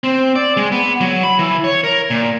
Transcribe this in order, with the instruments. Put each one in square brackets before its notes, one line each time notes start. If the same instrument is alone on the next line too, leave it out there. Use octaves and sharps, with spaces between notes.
[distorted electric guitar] C4
D5
G#3
B3
F#3
B5
E3
C#5
A#4
A#2